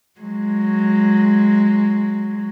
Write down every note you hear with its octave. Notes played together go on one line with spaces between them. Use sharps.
F#3 G#3